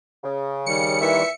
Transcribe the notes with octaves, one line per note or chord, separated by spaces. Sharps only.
C#3
D#3 G3 C#7
A#2 E3 E5